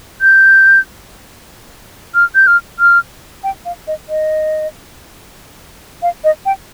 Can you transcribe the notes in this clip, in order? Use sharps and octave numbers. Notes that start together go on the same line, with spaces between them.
G6
F6
G6
F6
F6
G5
F5
D#5
D#5
F5
D#5
G5